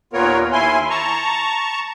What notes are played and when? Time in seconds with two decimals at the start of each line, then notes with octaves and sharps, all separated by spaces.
0.13 D#2 A#2 B3 F4 A#4 C#5
0.52 D#2 E4 G#5 C6
0.90 A5 A#5 C#6